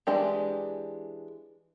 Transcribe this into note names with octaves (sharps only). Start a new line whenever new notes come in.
E3 G#3 D4 G4